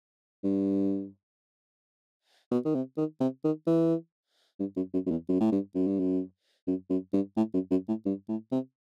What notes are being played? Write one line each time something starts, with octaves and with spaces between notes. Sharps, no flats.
G2
B2
D#3
C3
D#3
C3
D#3
E3
G2
F#2
F#2
F#2
E2
F#2
A2
G2
F#2
G2
F#2
F#2
F#2
G2
A2
F#2
F#2
A2
G2
A2
C3